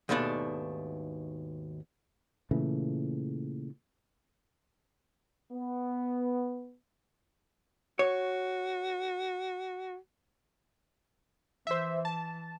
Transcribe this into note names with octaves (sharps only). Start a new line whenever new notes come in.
D#2 G#2 B2 A3 D4
A#2 C#3 E3 A3
B3
F#4 C#5
E3 C5 E5
A5